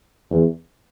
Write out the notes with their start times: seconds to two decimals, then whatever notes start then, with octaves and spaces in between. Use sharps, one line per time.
0.30 E2